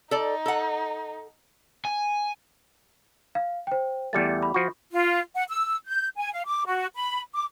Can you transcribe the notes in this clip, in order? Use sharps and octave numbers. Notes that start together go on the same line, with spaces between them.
D#4 A4 D5
A4 F#5
G#5
F5
C5 G5
E2 G3 A3 A6 C#7
B5
F3 F#4
F4
F#5
E6
G6
G#5
F5
D6
F#4
B5
D6